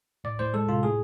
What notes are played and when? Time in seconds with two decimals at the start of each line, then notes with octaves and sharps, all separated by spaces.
0.24 A2 D5
0.39 A2 C5
0.53 G#3 A4
0.68 C3 F4
0.83 A2 G#4